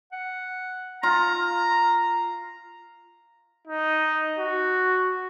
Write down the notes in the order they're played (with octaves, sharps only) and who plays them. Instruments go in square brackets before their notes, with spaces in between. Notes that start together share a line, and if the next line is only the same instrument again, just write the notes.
[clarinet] F#5
[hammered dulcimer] F4 [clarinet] A#5
[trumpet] D#4
F#4